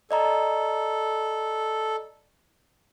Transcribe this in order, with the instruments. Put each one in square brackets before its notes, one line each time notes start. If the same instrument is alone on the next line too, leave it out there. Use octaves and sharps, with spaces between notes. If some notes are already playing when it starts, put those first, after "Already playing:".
[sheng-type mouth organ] A4 [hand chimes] D5 D#5 A#5